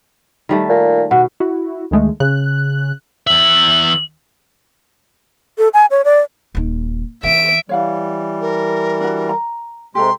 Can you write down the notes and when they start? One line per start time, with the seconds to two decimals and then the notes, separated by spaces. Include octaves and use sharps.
0.49 D#3 G3 A3
0.69 A#2
1.11 B2 F#4
1.40 E4 F#4
1.91 D2 D#3 G#3 A3
2.20 C#3 F#6
3.27 E2 E5 F#7
5.58 A4
5.74 G#5
5.91 C#5
6.05 D5
6.55 D#1 D#4
7.23 E3 C#4 E5 D7
7.69 E3 G3 C#5 F5 F#5
8.41 A#4
9.01 D4 F#4
9.29 A#5
9.95 C3 G#3 G4 A4 A#5 C6